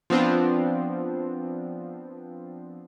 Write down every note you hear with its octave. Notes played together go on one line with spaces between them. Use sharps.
F3 B3 C4 D4 F4